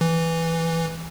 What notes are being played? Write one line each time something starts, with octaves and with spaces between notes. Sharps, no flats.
E3